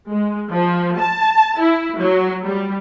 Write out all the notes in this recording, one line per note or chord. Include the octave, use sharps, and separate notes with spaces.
G#3
F3
A5
E4
F#3
G3